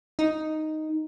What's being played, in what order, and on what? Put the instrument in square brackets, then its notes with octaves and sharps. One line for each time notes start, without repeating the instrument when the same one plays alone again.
[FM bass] D#4